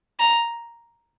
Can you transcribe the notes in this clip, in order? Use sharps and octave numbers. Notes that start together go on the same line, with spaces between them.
A#5